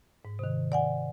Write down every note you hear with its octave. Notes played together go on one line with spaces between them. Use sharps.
G#2
C3 D#3
D5 F#5 G#5